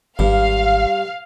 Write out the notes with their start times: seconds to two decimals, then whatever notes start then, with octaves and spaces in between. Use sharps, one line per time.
0.19 G#1 G2 F5